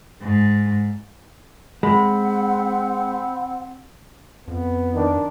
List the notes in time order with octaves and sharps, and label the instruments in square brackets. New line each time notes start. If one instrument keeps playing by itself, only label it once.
[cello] G#2
[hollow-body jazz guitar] G#3 [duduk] C4 [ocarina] F#5 [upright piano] B5
[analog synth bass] F2 [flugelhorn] B3
[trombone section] D#3 D4